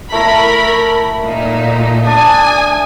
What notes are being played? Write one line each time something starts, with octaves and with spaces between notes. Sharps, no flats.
A3 E4 A#4 A#5 B5
A#2 D#4
D4 G#5 D#6